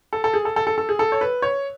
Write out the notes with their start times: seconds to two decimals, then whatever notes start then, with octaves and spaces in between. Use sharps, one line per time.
0.13 A4
0.24 A4
0.34 G#4
0.45 A4
0.56 A4
0.67 A4
0.78 A4
0.89 G#4
0.99 A4
1.12 C#5
1.21 B4
1.42 C#5